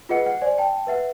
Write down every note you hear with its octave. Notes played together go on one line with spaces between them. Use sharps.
F4 G#4 B4 D#5 F#5 C#7
F#5
C5 D5 G#5
G5 A5
B4 E5 F#5